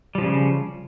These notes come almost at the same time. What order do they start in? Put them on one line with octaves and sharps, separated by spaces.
G3 F3 C#3